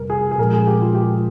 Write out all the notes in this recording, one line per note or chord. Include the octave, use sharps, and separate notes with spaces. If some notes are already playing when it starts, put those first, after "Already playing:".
Already playing: F2 C3 G3 A#4
G#4
G#4
A#2 F3 G#3 C#4 A#4
G#4
G4
F4
G4